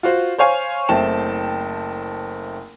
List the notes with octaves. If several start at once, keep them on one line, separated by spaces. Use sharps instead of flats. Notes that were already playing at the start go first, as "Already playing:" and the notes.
F4 F#4 C5
C5 C#5 F5 G#5
F#1 A3 C4 G5 A5 E7